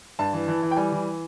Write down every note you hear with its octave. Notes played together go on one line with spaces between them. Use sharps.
G2 A5
E3
E3
E3
G5
G3 G#5
E3